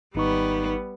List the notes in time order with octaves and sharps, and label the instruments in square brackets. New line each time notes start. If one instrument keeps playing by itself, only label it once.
[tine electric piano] G#1 D#4 C#6 [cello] G3 B3